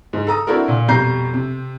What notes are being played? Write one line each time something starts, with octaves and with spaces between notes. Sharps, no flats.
G#2
A4 A#5 D#6
C4 D4 E4 F#4 A4 A#4
A#2
F2 B2 G3 A#5 G6 C7
C3